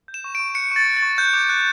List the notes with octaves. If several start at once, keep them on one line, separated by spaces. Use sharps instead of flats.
G6
E7
C#6
C#6 D7
F#6 C#7
C#6 A6
F#6
A6
C#6
F#6 G6
D6
F#6